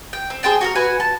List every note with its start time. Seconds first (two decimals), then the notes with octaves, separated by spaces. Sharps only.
0.13 G5
0.30 C4
0.43 G#4 C5 G5 A5
0.61 F#4 A4 A#4
0.75 F#4 B4 G#5
1.00 A5